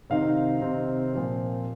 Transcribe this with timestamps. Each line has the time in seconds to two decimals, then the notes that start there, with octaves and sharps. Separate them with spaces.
0.10 C3 D#3 C4 D#4 F5
0.61 C3 D#3 C4 D#4
1.13 A#2 F3 C4